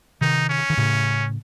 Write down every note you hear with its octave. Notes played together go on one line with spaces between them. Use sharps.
C3 D#3 D#4
C#4
D#3
A2 C#3